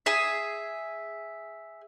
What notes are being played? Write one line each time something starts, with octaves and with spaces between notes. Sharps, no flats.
G#4 E5